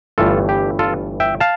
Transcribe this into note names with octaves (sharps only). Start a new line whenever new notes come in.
G1 G2 E3 A3 F4 A4
G4
F4 A4
E5 G5
F5 A5